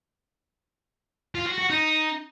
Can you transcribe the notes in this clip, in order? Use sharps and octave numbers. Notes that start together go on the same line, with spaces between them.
F4
F#4
F#4
D#4